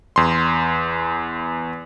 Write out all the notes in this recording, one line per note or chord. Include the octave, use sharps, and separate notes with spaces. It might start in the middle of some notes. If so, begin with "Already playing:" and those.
E2 C6